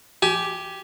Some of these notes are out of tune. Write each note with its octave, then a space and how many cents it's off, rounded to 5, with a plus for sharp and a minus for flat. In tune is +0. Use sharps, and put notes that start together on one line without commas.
G4 +0 G#5 +25